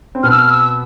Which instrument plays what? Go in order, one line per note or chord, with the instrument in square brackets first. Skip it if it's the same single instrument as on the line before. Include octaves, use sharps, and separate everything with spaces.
[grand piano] C4
[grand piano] B2 B3 [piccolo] F6
[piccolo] E6
F6
E6